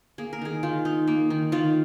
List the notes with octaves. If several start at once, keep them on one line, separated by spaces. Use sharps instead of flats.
A#3 G#4
A#4
D#3 G#4
D#3 F4
D#4
A#3
D#3
D#3 F4